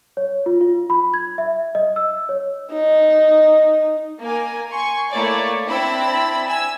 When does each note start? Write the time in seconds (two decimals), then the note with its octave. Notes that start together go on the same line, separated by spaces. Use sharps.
0.17 C#5
0.46 F4
0.61 F4
0.90 B5
1.14 G#6
1.38 E5
1.75 D#5
1.96 E6
2.29 C#5
2.72 D#4
4.20 A#3 A#4 G#5
4.68 G#5 C6 C#6
5.09 A3 A#3 E4 C#5 D5
5.66 C4 D4 E4 B5 E6
6.46 G#5 E6